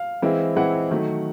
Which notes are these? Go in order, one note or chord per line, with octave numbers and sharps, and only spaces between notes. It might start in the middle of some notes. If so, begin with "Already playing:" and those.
Already playing: F5
E3 G#3 C4 E4
E3 G#3 C4 E4 F#5
D#3 F#3 A3